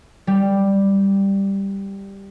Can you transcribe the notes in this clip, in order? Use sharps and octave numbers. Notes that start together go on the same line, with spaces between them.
G3 G4